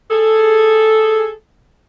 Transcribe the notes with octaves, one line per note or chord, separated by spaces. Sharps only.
G#4 A4